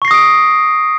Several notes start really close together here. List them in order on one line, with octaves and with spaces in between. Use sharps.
C#6 C7 A#6 D#6 D7